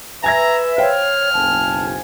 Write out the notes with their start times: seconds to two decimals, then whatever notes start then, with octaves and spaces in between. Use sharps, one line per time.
0.24 B4 E5 G#5 A#5 G#6 A#6
0.78 C5 C#5 F5 G5 F6
1.33 F#1 B1 G#5 A5